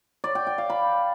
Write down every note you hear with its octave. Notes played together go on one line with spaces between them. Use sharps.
D5
G5
G5
F5
B5